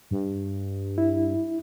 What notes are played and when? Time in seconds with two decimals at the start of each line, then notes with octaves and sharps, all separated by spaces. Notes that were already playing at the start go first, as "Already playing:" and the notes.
0.11 G2
0.98 E4